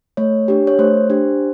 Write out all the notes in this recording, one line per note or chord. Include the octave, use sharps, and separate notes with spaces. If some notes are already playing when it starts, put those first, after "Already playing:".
A3 C#5
D4 G4
C#5
A3 C5
D4 G4